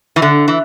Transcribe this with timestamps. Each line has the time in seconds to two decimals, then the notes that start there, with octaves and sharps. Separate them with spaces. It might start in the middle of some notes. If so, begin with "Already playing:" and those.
0.16 E3
0.22 D3
0.48 E3